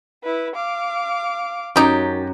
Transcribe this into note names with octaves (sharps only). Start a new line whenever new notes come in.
E4 B4
F5 D6
F#2 D#4 G4